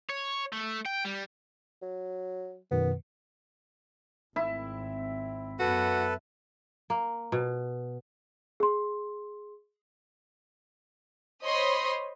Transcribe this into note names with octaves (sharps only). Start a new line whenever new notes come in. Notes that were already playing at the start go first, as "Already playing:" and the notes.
C#5
A3
G5
G3
F#3
F#2 B2 D#3 B3
G#1 C4 E4
F#2 B3 F#4 A4 B4
A#3
B2
G#4 C6
C5 C#5 D#5 B5 C6 D#6